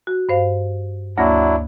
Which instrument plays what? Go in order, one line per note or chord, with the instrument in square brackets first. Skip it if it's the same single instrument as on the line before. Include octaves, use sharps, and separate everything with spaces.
[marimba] F#4
G2 C5 F5
[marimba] D2 A#3 A#6 [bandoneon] F#3 D4 E4